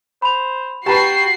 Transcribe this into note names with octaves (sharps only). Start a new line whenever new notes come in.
C5 B5 F7
F#4 G4 B4 G5 A5 A#5 C7